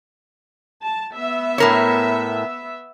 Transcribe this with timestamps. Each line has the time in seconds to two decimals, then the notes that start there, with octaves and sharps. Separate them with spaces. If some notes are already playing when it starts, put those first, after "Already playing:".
0.83 A5
1.15 B3 E5
1.58 A2 A#4 C#5